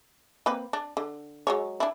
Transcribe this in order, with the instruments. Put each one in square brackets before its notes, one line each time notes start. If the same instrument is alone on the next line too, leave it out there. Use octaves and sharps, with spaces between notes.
[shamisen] A#3 C4 B4
D4
D3
F#3 G#3 C#5
D4 E4